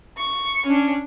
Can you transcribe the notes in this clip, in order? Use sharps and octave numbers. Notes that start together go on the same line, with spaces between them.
C#6
C#4 D4